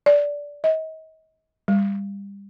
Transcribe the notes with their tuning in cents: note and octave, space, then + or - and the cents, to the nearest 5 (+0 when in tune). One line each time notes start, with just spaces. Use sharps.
D5 -15
D#5 +35
G3 +30